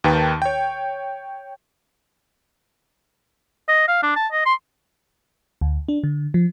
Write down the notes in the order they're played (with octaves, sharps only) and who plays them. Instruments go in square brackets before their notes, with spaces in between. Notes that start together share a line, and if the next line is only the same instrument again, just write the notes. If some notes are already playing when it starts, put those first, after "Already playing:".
[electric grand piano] D#2 D#3 D#4 B4 G5 A5
C#5 G5
[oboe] D#5
F5
D4
A5
D#5
C6
[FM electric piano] D2
D4
D3
F3